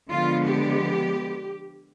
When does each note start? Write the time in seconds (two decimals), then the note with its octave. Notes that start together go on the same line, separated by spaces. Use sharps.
0.10 D3 F3 G#3 B3 F4
0.48 G4